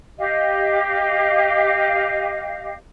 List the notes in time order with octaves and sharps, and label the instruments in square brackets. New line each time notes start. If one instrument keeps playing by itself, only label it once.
[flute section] G4 D#5 F5